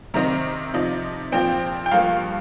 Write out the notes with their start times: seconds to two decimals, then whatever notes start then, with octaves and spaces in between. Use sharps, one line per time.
0.14 C3 D#3 C4 D#4 A#5
0.74 C3 F3 D#4
1.32 A#2 F3 C4 G5
1.86 G5
1.91 G2 F3 A#3 F5